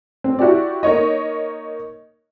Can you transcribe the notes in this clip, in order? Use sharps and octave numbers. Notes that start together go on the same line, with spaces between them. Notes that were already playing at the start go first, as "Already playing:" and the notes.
C4
E4 F#4 G4 D5
A#3 D#4 C#5 D#5